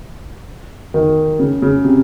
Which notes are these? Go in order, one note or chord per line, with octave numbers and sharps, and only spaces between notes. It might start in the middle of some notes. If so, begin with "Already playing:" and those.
D#3
C#3
C#3
C3